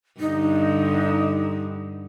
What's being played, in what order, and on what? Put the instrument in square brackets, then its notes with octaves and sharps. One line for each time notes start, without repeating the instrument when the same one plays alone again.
[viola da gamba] G2 D3 [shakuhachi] D#4